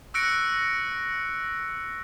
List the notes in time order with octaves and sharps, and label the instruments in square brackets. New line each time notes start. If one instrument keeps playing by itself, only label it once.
[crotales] C#6 E6 F#6 A#6 C#7 D7